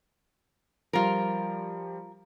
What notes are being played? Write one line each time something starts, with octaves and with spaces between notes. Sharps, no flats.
F3 G3 F4 A#4